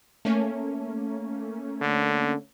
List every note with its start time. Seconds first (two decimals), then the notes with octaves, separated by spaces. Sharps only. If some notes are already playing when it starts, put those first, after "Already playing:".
0.25 A3 A#3 C#4
1.81 D3